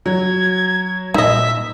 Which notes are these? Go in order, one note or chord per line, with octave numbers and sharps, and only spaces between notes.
F#3 G#6
A#2 G3 D#4 D#5 E5